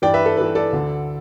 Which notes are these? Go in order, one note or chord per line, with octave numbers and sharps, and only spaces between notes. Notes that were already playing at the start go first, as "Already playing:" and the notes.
G2 E3 D5 G5
B4 E5
A4
G2 E3 B4
A4 D5
D2 D3